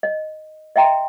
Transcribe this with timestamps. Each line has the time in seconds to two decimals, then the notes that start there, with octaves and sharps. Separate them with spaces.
0.03 D#5
0.76 D#5 E5 G5 A#5 C6